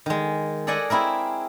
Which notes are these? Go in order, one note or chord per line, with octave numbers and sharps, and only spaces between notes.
D#3 G#3
G#4 A4 D5 D#5 F#5 G#5
C4 E4 G#4 A#4